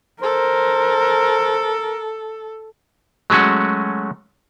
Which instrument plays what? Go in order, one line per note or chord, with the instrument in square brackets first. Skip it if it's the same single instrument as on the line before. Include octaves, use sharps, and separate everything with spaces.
[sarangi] A4 [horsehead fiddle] A#4 [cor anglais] C5
[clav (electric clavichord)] F#3 G#3 A3 C#4 F#4